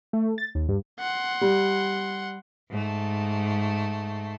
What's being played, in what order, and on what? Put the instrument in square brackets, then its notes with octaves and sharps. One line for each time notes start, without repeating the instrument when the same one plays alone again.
[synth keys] A3
A6
D#2
G2
[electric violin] F#5 C6
[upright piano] G3
[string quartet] G#2 A3